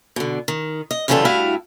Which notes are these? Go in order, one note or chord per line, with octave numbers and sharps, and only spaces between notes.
B2 D3
D#3
D#5
F#2 C#3 E3 G3 F4 A4
G2 A3 E4 F#4 F5